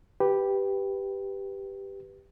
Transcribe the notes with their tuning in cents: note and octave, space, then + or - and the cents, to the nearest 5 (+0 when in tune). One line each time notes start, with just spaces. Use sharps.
G4 +0 B4 +0